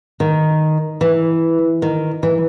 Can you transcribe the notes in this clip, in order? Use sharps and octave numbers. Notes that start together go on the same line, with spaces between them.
D#3
E3
D#3
E3